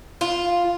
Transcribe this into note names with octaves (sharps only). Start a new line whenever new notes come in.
F4